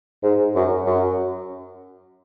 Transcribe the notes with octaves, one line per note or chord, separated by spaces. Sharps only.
G#2
F#2
F#2